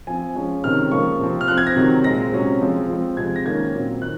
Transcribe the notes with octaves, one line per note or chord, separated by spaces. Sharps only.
F3 C4 G#5
F3 G#3 C#4
C3 D#3 G#3 C#4 F6
C#3 F3 A#3 C#6
C3 F3 C4
F6
F3 C4 F#6
G#6
A#6
C3 D#3 F#3 C4
A#2 G#3 C4 A#6
C3 F#3 C#4
F3 G#3 C4
F3 C4
C3 F3 G#3 G#6
A#6
D#3 A#3 C#4 G#6
A#2 F#3 C4
D#3 F#6